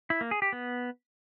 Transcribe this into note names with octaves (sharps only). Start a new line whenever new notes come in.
E4
A#3
G#4
G4
B3